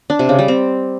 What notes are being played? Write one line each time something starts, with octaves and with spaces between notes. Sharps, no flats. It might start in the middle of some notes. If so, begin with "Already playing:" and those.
D4
C3
C#3
G3
C4